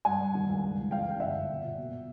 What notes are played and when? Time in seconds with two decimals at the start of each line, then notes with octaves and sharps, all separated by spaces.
0.05 G2 F#5 G#5
0.20 G2
0.35 D#3
0.49 C#2
0.63 C#2
0.77 C#2
0.91 E3 F5 G5
1.07 C#3 G5
1.20 G1 E5 F#5
1.35 G1
1.50 A#2
1.64 A#2
1.78 B2